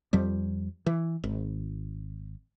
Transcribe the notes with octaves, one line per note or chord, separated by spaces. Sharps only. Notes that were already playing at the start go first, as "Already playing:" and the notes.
F2 F3 G3
E3
G#1